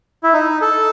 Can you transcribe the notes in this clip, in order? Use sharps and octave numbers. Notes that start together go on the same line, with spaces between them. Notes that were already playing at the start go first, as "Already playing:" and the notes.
E4
D#4
A4